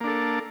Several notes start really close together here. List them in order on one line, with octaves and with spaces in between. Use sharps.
A#3 D4 A4